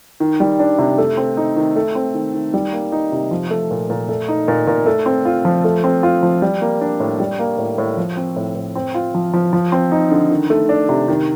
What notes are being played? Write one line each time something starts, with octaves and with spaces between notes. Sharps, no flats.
D#3
G3
D4
C3
A3
C4
D#4
D#3
A3
C4
D#3
D#3
G3
A#3
D#4
C3
F3
A3
A#2
A#2
A3
D#4
A#2
A#2
A3
C4
F4
F3
A3
C4
F4
F3
G3
A#3
D4
A2
G3
A#3
A2
A2
F3
C4
A2
A2
C4
F4
F3
F3
F3
C4
D#4
D3
D#3
A3
D4
C3
D#3